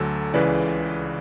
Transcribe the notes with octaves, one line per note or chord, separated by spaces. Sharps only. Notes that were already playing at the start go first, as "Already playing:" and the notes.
Already playing: D2 D3 F#3 A4
C#2 C#3 E3 B4 D5